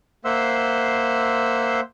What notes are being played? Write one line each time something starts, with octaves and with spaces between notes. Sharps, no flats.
A#3 C5 E5 F#5 C6 E6